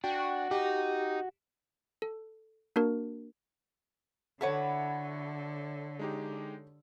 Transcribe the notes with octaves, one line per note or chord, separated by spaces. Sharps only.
D4 F#4 G5
D#4 G4
A4
A#3 D4 F#4 A#4
D3 E4 F#4 A4 B4 C#5
G#3 D#4 G4